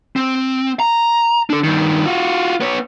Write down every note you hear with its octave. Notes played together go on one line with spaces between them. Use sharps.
C4
A#5
D4 A4
G2 D#3
F4 F#4
B3 C#5